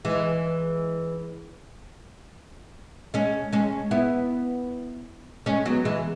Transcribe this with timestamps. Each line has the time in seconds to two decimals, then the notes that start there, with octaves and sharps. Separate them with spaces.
0.05 E3 G#3
3.14 G#3 C#4
3.53 G#3 C#4
3.91 B3 E4
5.46 G#3 C#4
5.66 F#3 B3
5.85 E3 G#3